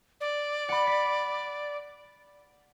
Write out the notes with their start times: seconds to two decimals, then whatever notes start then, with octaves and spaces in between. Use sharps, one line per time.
0.21 D5
0.69 F#5 B5
0.87 B6